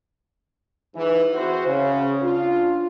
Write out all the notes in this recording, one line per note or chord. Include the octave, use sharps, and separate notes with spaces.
G#2 E3
C4 E4 F#4 G#4 C5
C#3
D4 F4